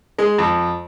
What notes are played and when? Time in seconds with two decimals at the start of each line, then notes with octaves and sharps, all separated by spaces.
0.19 G#3
0.38 F2